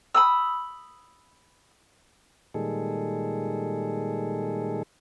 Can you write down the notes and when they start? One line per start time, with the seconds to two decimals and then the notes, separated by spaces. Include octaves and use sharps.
0.15 B5 D#6 E6
2.54 A#2 D#3 G3 G#3 G#4 A4